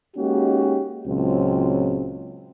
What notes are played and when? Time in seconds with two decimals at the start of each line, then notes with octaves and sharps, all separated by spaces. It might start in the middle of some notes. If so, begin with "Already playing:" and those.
0.17 G#3 A#3 C#4 D#4 F#4 G4
1.06 C#2 A#2 F#3 C4